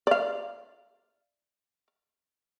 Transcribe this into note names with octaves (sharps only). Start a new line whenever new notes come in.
D5 F5